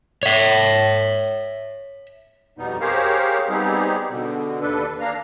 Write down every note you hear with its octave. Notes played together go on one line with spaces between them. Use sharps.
C#5 E5
F2 B2 G3 B3 D#4
G4 G#4 A#4 C5 C#5 F5
G3 B3 C4 D#4 G4 G#4
B2 D3
D#2 D4 A4 B4
A#3 D4 F5 A#5